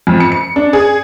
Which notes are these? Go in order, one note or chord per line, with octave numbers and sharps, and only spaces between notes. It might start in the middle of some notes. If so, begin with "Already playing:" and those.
F2
C#7
C#7
D4
G#4